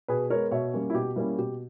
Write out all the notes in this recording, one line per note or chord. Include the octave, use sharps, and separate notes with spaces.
B2 G#4 B4
G#3 B3 A#4 C#5
B2 C#5 E5
G3 A#3 C#4
E4
B2 G4
G3 A#3 C#4 E4
B2 G4